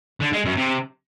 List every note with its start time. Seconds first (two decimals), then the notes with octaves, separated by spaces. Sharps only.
0.21 D3
0.33 G#3
0.45 F#2
0.57 C3